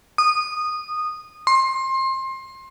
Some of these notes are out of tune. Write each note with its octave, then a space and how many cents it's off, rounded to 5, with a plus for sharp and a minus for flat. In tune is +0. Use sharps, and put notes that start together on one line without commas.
D#6 -20
C6 +25